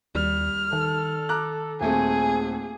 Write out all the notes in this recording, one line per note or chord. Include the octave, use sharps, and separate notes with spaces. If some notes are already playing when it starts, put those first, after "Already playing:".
D#2 G3 F6
D#3 A4
A#5 D6 F#6
D#1 A3 C4 G#4 G#5